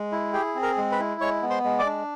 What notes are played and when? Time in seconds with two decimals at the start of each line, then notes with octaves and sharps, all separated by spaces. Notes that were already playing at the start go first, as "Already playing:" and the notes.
Already playing: G#3
0.12 E4
0.33 G4 G#4 G5
0.55 C4
0.63 A#4 A#5
0.77 G#3
0.91 B4 B5
0.99 E4
1.21 G#3 C#5 C#6
1.42 B3
1.50 C5 C6
1.64 G#3
1.79 D5 D6
1.86 D4